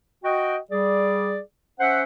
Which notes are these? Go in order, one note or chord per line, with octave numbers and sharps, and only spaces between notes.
F#4 D#5 G5
G3 G#4 D5
C#4 C5 E5 F#5